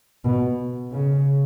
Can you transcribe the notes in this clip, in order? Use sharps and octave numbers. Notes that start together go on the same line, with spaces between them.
B2
C#3